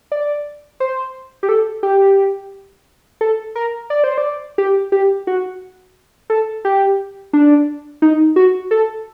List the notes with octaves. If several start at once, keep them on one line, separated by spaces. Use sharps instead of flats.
D5
C5
G4
A4
G4
A4
A#4
D5
C5
D5
G4
G4
F#4
A4
G4
D4
D#4
F#4
A4